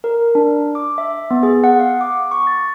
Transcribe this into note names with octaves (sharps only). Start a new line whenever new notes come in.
A#4
D4
D6
E5
B3
G#4
F#5
F5
D6
C#6
A6